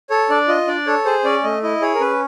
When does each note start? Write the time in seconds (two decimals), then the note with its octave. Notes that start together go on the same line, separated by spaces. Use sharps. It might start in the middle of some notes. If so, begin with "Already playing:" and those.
0.10 A4 C#5
0.30 D4 D5
0.48 F4 D#5
0.67 D4 D5
0.87 A4 C#5
1.05 G#4 C5
1.24 C#4 D5
1.44 A3 D#5
1.63 E4 D#5
1.82 G#4 C#5
1.95 A#4
2.00 C#4 B4